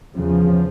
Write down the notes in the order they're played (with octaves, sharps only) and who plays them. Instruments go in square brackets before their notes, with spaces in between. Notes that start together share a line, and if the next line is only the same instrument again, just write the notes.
[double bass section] E2 C#3 F3